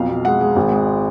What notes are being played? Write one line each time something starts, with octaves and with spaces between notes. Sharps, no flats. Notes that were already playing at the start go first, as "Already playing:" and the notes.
Already playing: B1 F2 F5
B2
G#3 F#5
G#3
G#1
G#3